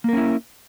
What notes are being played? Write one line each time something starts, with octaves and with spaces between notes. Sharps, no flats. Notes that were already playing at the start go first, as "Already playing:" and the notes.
A#3 C#4 E4 A#4